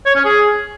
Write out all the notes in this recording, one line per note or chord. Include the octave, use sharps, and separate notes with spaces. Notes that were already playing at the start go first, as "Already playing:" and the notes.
C#5
C#4
G#4